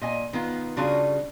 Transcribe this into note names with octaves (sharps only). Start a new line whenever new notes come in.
A#2 D#5 G#5
D#3 B3 F4
C#3 G3 D4 F4 F#4 G#4